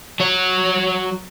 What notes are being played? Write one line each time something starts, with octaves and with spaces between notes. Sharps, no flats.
F#3 C#5